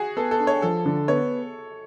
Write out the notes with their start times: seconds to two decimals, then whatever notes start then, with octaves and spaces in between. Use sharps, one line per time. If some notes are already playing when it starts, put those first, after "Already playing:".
Already playing: F#4 G#4
0.17 B3 A4
0.31 A4
0.40 D4
0.47 C#5
0.62 F3 A4
0.86 D3
1.08 B3 C#5